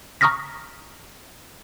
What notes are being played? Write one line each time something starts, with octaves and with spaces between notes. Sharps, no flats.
A#5 C#6 D#6 F6 A#6 B6